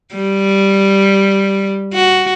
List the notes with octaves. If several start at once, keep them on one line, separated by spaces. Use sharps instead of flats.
G3
F#4